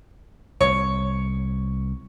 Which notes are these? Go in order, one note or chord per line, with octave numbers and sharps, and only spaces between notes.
C2 C#5